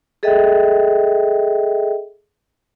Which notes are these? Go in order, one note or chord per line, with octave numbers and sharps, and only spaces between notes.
G#4 A4 D#5 E5 G5